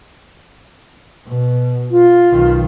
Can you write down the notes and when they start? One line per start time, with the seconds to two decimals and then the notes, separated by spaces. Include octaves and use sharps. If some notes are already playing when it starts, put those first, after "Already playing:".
1.27 B2
1.91 F4
2.32 B1 D#3